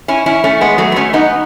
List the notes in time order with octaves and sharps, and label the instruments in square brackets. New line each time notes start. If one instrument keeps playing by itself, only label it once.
[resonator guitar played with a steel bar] C#4 E4
C#4 E4
A3 C#4
G#3 B3
F#3 A3
B3
A3 C#4
B3 D#4